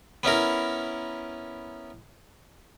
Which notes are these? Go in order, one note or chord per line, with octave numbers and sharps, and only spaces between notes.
B3 C#4 E4 A#4